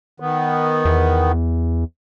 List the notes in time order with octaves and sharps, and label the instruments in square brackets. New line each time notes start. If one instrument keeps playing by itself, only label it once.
[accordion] D#3 B3
[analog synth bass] E2